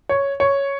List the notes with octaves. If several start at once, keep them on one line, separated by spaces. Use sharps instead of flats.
C#5
C#5